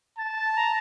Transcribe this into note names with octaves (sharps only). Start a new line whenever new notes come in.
A5 A6
A#5